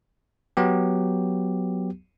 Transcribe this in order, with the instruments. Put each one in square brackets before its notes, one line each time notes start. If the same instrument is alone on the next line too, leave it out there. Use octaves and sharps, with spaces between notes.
[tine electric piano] F#3 B3 G4